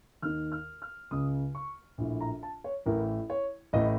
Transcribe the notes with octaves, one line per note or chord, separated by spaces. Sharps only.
D#2 D#3 F6
F6
F6
C#2 C#3 D#6
C#6
A#1 A2
A#5
A5
C#5
A1 A2 A#4
C#5
A1 A2 D#5